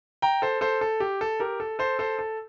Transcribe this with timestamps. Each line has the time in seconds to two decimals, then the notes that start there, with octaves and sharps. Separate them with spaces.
0.22 G5 A#5
0.42 A4 C5
0.61 A4 C5
0.81 A4
1.00 G4
1.21 A4
1.40 G4 A#4
1.60 A4
1.79 A4 C5
1.99 A4 C5
2.19 A4